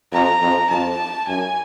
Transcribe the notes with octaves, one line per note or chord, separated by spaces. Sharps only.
F2 A#5
F2
F2 A5
F#2 G#5